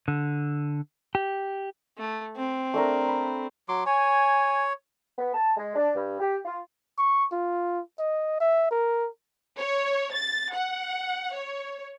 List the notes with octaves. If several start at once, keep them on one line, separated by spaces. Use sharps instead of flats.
D3
G4
A3
C4
A3 D4 A#4
B5
F#3 C6 D6
C#5 G#5
B3
A5
G#3
D4
G2
G4
F4
C#6
F4
D#5
E5
A#4
C#5
A6
F#5
C#5